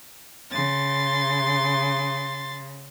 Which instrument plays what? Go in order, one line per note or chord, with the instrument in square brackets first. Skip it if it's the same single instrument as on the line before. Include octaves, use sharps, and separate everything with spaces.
[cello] C#3 [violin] C6 A6